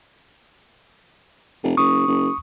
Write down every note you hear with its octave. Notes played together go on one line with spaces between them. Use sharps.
F1
F#1 C#6 D#6
F#1